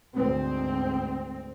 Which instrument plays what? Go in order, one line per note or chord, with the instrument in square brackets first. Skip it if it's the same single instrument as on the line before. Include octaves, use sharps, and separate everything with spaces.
[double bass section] D2 G#2 C4